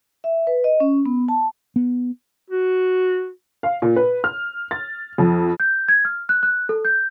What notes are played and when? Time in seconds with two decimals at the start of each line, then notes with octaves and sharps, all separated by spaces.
0.24 E5
0.47 B4
0.64 D#5
0.80 C#4
1.06 B3
1.28 A5
1.76 B3
2.50 F#4
3.63 F5
3.82 A#2
3.96 B4
4.24 F6
4.71 A6
5.18 F2
5.60 G6
5.88 G#6
6.05 F6
6.29 F#6
6.43 F#6
6.69 A4
6.85 G6